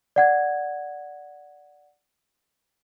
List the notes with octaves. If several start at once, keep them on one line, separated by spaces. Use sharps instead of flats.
D5 F#5 G#6